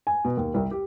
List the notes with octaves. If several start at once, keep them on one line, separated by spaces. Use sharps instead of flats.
G#5
B2
D#2
C2
G4